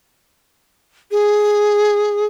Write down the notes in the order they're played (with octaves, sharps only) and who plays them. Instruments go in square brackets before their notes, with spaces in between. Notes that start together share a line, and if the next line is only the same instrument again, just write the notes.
[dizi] G#4